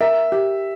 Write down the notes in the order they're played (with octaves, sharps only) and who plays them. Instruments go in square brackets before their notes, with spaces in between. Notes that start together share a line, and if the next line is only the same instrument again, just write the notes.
[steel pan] A#4 [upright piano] E5
[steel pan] G4